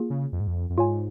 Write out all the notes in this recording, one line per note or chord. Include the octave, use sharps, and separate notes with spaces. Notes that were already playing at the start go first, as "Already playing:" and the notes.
Already playing: A#3 F4 G#4
C#3
F2
G#2
F2
F2
G#2 F4 C#5 G#5